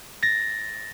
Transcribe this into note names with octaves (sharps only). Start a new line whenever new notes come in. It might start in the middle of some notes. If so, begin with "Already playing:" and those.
A6 A#6